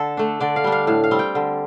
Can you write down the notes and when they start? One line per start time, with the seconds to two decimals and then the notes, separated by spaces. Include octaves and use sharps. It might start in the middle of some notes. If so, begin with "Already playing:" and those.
Already playing: D3 A4
0.17 A3 D4
0.40 D3 D5
0.56 F5
0.64 G3 D4
0.72 F5
0.87 A2 F5
1.04 F5
1.11 G3 C4
1.19 G5
1.35 D3